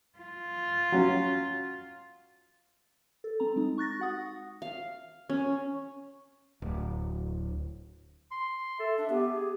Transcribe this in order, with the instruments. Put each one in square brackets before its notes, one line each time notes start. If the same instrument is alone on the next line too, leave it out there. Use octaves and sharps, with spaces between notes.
[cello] F4
[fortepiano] F#3 C#4
[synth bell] A4
C4 A#5
G#3 D#4
C#6 F#6 A6 A#6
F#4 F#5 D#6
[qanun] F5
C#4
[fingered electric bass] D1
[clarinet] C6
[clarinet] A4 [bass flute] E5
[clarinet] D4 [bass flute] E5
[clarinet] B3 [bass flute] G4
[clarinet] G#4